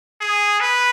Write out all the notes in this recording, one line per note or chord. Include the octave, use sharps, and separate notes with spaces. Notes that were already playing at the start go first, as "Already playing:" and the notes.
G#4
B4